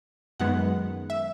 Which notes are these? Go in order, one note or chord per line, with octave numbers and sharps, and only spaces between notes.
F#2 D#3 G#3 B3 F#5
E5